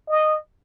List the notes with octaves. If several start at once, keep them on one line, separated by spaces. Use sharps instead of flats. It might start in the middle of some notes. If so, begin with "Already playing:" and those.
D#5